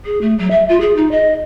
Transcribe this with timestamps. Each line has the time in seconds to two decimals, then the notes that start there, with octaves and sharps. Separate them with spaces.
0.05 G#4
0.21 A3
0.38 F#3
0.51 E5
0.69 F4
0.80 G#4
0.96 D#4
1.11 D#5